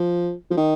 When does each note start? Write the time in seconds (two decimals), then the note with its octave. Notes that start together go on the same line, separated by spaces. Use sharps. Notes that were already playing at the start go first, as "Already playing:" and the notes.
Already playing: F3
0.51 F3
0.57 D#3